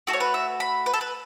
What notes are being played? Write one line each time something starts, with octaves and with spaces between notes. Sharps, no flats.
A3 F#4 A4
C#5
B4
E5
B5
B4
A4
B4